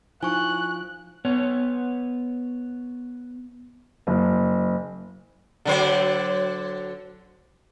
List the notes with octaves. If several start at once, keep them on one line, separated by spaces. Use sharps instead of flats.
F3 D#4 E4 G#5 C#6 F#6 G7
B3 C#5
F#1
D3 F#3 C5